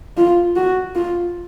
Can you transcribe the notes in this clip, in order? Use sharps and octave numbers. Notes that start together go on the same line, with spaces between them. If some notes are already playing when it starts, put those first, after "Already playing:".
F4
F#4
F4